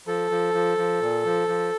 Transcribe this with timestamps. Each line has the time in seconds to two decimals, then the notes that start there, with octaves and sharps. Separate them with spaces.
0.07 F3 A4
0.31 F3
0.54 F3
0.78 F3
1.01 A#2
1.25 F3
1.48 F3